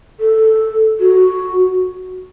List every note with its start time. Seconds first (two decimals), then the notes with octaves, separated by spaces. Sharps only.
0.20 A4
1.00 F#4